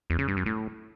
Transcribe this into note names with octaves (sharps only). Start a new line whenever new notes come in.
E2
C#3
G2
F#2
A2